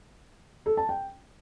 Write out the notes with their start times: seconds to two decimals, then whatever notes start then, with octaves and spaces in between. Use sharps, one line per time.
0.66 A4
0.77 A5
0.89 G5